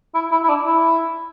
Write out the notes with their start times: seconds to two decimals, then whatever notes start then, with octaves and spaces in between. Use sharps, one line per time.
0.14 E4
0.32 E4
0.43 E4
0.49 D4
0.66 E4